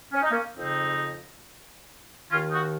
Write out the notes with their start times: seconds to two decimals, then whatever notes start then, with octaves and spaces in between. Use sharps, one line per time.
0.13 C#4
0.22 D#4
0.31 A#3 C#4
0.56 F2 C#3 C4 D#4
2.30 D#2 D#3 C#4 F4
2.51 D#4 F#4